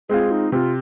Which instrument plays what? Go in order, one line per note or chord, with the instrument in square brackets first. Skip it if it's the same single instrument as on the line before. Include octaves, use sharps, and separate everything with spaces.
[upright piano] G#3 C4 F4 [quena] G#4
[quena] D#4
[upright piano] C3 [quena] F4